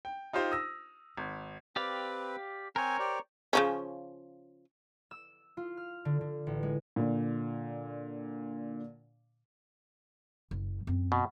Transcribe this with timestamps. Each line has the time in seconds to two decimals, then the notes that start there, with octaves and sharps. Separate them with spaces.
0.05 G5
0.33 D#4 F4 G4 C5 F5
0.51 D#6 E6 A#6
1.17 G#1
1.76 C4 G4 B4 D5 F5
2.76 C4 A#4 C5 C#5 G#5
2.99 G4 C5 D5
3.53 C#3 F3 C#4
5.11 E6
5.57 F4
5.77 F6
6.05 D3
6.21 D3
6.47 A1
6.63 G#3
6.96 A#2 D3
10.51 F#1
10.87 F#2 C4
11.12 B2